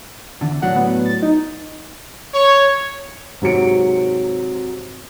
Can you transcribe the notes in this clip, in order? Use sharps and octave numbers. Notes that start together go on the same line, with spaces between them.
E2 D3
A2 F#3 D4 F#5
B3
A6
D#4
C#5
G#2 C3 F#3 C#7 D7